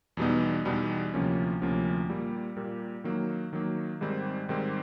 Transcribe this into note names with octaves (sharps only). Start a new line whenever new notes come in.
E2 B2 G3 B3 D#4
E2 B2 G3 B3 D#4
D2 C3 F3 A#3 C#4
D2 C3 F3 A#3 C#4
A#2 G3 A#3
A#2 G3 A#3
D#3 F#3 A#3
D#3 F#3 A#3
G#2 D#3 G3 C4
G#2 D#3 G3 C4